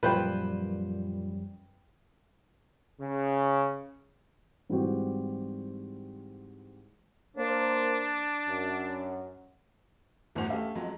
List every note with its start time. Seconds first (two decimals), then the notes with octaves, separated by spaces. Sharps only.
0.03 F#2 A#2 F3 G3 B4 C5 G5
3.00 C#3
4.69 G#2 E3 G3 C4 F#4 G4
7.37 A#3 D4 C5
8.48 F#2
10.35 G1 E2 A2 F#4 C5 F7
10.50 A3 C#4 G4 A4 E5 F5
10.75 F2 F#3 G#3